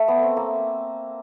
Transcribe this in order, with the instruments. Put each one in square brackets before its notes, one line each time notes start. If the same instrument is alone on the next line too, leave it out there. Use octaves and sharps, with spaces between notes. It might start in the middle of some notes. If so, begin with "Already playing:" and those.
Already playing: [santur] A3
B3
C4
A#3